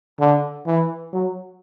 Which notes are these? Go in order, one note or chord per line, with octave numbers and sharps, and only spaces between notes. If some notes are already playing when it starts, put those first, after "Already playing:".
D3
E3
F#3